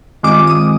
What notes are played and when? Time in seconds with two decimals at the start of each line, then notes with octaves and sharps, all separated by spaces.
0.23 G2 D#3 G#3 C4 F4 D6
0.47 D#6